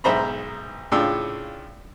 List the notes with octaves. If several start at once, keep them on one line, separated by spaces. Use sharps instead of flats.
B1 G#2 C5 E5 A#5 B5
A2 C#3 D4 F4 G5 E6